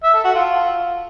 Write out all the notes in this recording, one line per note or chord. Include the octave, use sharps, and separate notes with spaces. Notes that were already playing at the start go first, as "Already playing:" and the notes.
E5
A4
F#4
F4